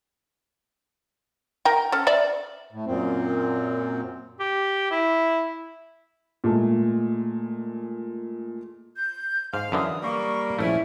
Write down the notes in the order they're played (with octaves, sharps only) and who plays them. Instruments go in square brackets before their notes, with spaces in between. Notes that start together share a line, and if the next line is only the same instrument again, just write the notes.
[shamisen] A#4 G5
C#4 A4
D5 E5
[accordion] A2
F#2 A#2 C4
[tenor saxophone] G4
E4
[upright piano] A#2 G#3 A3
[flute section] G6
[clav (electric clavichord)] G#2 [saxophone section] F5
[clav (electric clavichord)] F#2 D3 E3 [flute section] D#6
[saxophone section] G3 A#3 [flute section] C#6
[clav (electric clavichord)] A#1 A3 [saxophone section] C#4 E4 [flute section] E5